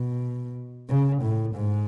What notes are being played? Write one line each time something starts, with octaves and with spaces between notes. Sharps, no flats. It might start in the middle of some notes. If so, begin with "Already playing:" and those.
Already playing: B2
C#3
A2
G#2